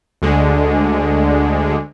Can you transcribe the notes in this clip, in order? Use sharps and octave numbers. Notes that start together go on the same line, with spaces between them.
D2 D3 G#3